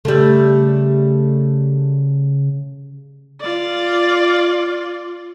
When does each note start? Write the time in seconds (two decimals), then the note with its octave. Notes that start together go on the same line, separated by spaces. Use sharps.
0.05 C#3 G3 A3
3.41 F4 D5